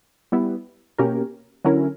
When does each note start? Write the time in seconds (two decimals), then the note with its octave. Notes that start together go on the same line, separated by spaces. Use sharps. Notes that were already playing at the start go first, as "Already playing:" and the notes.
0.32 G3 B3 E4
0.98 B2 A#3 C#4 G4 A#4
1.65 D3 F#3 C#4 E4 A#4